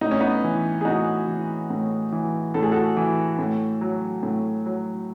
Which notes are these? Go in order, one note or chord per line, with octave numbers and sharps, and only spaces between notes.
A2 D#4
C#4
B3 D#4
E3
G#4
A2 D#4 F#4
E3
A2
E3
A2 A4
G#4
F#4 A4
E3
A2
F#3
A2
F#3